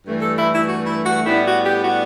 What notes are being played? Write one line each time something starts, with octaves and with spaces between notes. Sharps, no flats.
G2 E3 A3
A4
E4
E4
F#4
E4
F#4
A2 G3 B3 D4 E4
F#4
G4
F#4